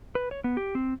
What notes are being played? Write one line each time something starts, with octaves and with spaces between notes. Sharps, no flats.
B4
C#5
B3
G4
C4